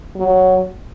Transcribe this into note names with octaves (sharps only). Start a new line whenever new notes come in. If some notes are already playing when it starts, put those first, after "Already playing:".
F#3